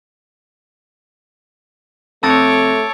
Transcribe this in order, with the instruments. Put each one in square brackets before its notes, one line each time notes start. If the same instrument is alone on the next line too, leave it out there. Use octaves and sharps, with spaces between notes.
[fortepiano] F2 [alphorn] A3 [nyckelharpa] C#5 D6 [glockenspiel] A5 E6 A6